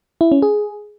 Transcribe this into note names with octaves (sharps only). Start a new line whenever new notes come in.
E4
C#4
G#4